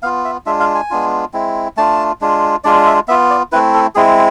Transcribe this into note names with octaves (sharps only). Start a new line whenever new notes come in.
B3 F4 F5
E5
G#3 D4 F4 E5
F5
G#5
G#3 B3 D4 F4
G#3 C4 E4
A3 D4 F4 A5
G#3 D4 F4
G#3 D4 F4 D5
E5
B3 F4 E5
D5
A3 C4 E4 B4
A4
G#3 C4 E4 G#4